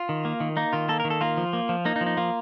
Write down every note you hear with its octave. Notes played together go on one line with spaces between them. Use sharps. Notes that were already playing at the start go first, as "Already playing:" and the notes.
Already playing: F4
D#3
A#3
D#3
A#3 D#4
D#3 F4
A#3 A4
D#3 A#4
A4
A#3 F4
F3
A#3
F3
A#3 D#4
D#4
F3
D#4
A#3 F4